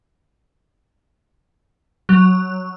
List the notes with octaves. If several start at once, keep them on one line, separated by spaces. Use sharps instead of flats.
F#3